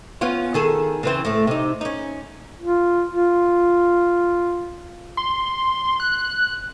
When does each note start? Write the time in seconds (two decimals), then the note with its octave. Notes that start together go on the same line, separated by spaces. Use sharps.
0.21 B3 C#4 F4
0.54 D#3 G#4 A4
1.03 C#3 E3 C4
1.25 A2 A3
1.47 C3 D#4
1.81 C#4 D#4
2.60 F4
3.10 F4
5.17 C6
6.00 F#6